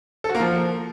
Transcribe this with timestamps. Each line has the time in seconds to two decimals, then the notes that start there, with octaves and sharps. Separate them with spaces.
0.24 A4
0.29 F#4
0.35 A#3
0.40 F3